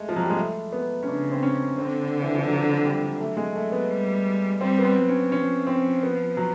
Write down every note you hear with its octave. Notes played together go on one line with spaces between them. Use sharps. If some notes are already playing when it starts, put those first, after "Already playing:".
Already playing: G#3 A3
F3
F#3
G3
G#3
A3
B3
C#4
C#3 D4
C4
C#4
D3 C4
E3
F3
F#3
G3
F#3 A3
G#3
A3
B3
G3
G3 C4
B3
C4
F#3
C#4
F3 C#4
C4
B3
F#3